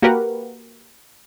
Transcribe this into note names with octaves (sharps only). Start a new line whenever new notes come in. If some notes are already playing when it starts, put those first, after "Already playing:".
A#3 F#4 G4 A#4 B4 F#5